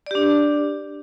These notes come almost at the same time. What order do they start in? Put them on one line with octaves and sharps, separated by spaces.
D5 G4 D4